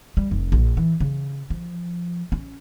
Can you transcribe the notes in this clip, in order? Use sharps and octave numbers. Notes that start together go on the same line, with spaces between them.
G3
F1
A#1
E3
C#3
F3
C#4